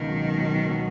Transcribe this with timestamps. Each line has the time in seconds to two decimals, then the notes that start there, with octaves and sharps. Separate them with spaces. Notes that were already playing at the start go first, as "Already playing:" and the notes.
Already playing: C#2 B2 D#3
0.09 F#3
0.24 B2
0.38 F#3
0.53 B2
0.69 F#3